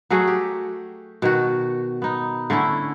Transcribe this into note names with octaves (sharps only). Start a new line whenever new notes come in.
F#3 A3 F#4 G#4
G4
B2 D#3 F#4
B3 D#4
D3 A3 C#4 E4